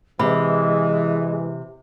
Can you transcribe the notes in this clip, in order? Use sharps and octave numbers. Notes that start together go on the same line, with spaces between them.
C3 E3 G#3 B5